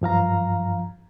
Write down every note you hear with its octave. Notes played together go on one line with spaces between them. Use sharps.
G2 F3 F5 A#5